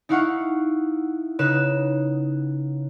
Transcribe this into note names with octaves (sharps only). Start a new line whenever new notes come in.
D#4 E4 F5 F#5 C#6
C#3 D#4 B4 F#6 E7